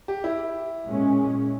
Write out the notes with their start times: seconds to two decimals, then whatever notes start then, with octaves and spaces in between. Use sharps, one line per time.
0.08 G4
0.24 E4
0.85 A#2 G#3 C#4